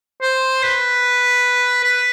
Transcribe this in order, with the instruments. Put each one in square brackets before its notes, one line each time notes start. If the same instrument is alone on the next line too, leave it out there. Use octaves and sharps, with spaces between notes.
[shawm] C5
B4
B4